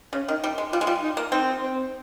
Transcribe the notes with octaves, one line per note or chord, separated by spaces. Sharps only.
C#3 C#4
D#3
G3 D#4
G#3
G3 F4
G#3
G3 F4
D#4
A#3
C4 D#4
C4